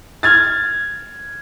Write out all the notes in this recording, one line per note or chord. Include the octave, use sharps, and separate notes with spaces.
F6 G#6 A6